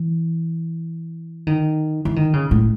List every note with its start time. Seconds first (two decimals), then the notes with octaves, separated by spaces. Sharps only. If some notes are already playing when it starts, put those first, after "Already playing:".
Already playing: E3
1.47 D#3
2.05 E3
2.16 D#3
2.33 C#3
2.51 A2